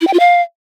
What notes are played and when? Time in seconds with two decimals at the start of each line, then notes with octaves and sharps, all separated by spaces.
0.01 E4
0.07 G5
0.13 F4
0.20 F5